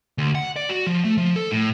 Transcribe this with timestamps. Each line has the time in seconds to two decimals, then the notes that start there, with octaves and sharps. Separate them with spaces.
0.18 D2
0.35 F#5
0.56 D5
0.69 F#4
0.87 F3
1.04 A3
1.17 F3
1.36 A4
1.51 A2